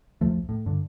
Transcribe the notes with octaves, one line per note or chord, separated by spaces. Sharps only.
B1 E2 F3 A3
A2
G2 D3